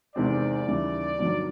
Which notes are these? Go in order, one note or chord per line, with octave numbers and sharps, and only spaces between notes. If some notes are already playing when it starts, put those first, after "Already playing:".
E2 C3 D#3 G#3 C4 D5
D#2 C#3 E3 G3
G1 G2 D#3 F#3